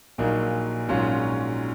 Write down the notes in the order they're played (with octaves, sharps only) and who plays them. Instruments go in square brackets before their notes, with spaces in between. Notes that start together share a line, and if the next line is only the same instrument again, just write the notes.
[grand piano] A#1 A#2 F#3 A#3 D#4
A#1 G#2 F#3 C#4 F4